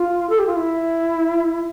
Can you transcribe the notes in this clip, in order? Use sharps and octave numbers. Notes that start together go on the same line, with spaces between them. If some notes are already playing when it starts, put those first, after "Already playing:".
Already playing: F4
A4
G4
F4
E4